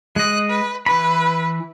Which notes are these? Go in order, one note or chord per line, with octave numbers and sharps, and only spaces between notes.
G#3 D#5 F#6
B4
E3 B4 B5